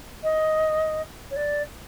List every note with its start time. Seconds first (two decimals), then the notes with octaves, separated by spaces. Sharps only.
0.23 D#5
1.30 C#5
1.36 D5